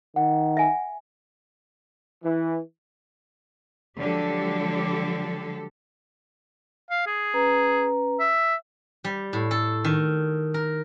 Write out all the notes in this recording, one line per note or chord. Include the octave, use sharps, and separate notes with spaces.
D#3 F#5
E5 G#5
E3
D3 F3 F#3 G#3 G4 A4
F5
G#4
C#4 B4 A#5
E5
G3
A2
A4
D#3
A#4